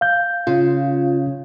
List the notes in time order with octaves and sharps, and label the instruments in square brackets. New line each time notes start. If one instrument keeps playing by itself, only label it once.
[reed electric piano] F5 G6
[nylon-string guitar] C#3 [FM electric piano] F4